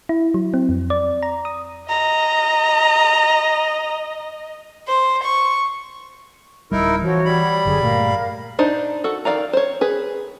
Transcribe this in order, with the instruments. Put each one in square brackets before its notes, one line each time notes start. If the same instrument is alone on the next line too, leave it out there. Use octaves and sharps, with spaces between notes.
[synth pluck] E4
F#3
C4
F2
D5
A#5
D#6
[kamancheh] D#5 [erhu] A#5
[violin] C5
C#6
[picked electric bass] D1 C2 G3 [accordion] D#4 E4 A#4 [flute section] E6
[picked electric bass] E3 [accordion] F3 [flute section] F#4 C#5
[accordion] G3 B5
[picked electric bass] F#1 F#2 D3 [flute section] G#4
[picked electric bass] G2 A#2 A3 [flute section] A#4 F5
[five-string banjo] D4 D#4 C5 D#5
F#4 A4
D#3 E3 D5 F5 A#5
C5 C#5
G#4 B4